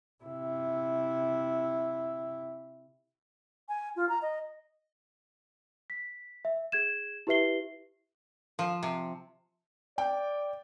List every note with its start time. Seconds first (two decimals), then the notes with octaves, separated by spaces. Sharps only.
0.24 C3 E4
3.69 G#5
3.96 F4
4.09 A#5
4.22 D#5
5.90 B6
6.45 E5
6.72 G#4 G#6 E7
7.27 E4 G4 B4 E5 C7 G7
8.59 F3
8.83 C3
9.98 D5 G5